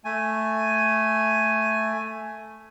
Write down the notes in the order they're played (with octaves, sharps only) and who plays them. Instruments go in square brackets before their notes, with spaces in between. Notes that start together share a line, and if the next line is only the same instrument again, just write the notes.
[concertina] A3 G#5